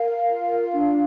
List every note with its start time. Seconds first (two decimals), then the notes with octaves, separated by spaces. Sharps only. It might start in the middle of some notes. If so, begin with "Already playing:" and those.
Already playing: A#4 F5
0.29 F4
0.72 D4